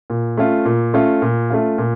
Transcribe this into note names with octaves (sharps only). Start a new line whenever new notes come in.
A#2
A3 C#4 F4
A#2
A3 C#4 F4
A#2
A3 C#4 F4
A#2